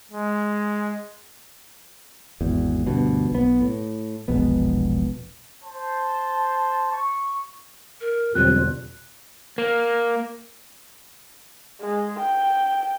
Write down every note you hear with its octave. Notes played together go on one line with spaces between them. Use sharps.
G#3
G#1 E2
D2 G2 B2
B1 B3
A2
E1 A#1 B2 B3
C5 A5
C#6
A#4
E2 B2 D3 F#3 G3 C4 F4 F#6
A#3
G#3
G5